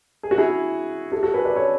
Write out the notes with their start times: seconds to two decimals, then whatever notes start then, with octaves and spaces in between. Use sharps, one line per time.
0.23 G#4
0.31 F#4
0.38 E4 G#4
1.12 F#4 A4
1.23 F#4 A4
1.34 G#4 B4
1.45 B4 D5
1.56 A4 C#5